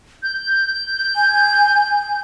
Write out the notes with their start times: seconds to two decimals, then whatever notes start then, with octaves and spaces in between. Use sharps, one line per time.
0.23 G6
1.16 G#5